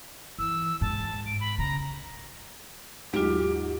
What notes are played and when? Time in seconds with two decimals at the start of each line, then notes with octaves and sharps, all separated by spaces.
0.39 E3 E6
0.81 G#2 A5
1.26 D7
1.40 B5
1.58 C#3 A#5
3.13 D#2 G#2 F#3 F4 G4 D7